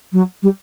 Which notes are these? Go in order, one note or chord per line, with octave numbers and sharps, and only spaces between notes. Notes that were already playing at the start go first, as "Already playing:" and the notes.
F#3
G3